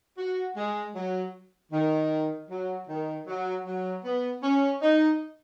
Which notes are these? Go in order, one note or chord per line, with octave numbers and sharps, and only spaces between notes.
F#4
G#3
F#3
D#3
F#3
D#3
F#3
F#3
B3
C#4
D#4